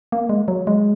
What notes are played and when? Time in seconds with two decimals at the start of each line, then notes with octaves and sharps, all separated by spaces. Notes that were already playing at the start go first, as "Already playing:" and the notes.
0.12 A#3
0.29 G#3
0.48 F#3
0.67 G#3